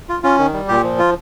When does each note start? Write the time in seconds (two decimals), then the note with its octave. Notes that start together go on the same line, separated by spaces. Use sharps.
0.09 F4
0.23 C#4 F4
0.39 D#3
0.53 G3
0.68 A#2 G4
0.83 F3
0.99 F4